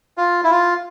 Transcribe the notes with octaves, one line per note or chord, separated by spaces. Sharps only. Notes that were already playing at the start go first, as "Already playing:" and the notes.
F4
E4
F4